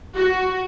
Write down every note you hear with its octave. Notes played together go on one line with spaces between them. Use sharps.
F#4